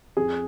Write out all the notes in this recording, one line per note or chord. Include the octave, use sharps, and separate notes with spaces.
F2 G#4